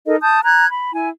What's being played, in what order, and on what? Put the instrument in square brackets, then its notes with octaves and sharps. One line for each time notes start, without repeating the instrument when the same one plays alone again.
[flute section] D#4 A4 A#4 D#5
A5 D#6 G6
A#5 F#6 G#6
B5
E4 G#5